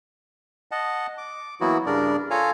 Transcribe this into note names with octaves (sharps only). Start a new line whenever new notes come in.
D#5 F#5 A5
D6
E3 F#3 A#3 B3 E4 F#4
G2 C#3 D4 A#4 D5
F4 A4 C#5 F5 G#5 A#5